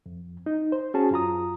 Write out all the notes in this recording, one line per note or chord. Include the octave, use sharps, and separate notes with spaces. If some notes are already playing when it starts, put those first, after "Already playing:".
F2
D#4
C5
C#4 F#4 G#4 A5
F#2 F4 A#5 D#6